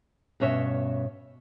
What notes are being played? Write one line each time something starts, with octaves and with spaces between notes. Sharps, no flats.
G2 B2 C#4 C#5 E5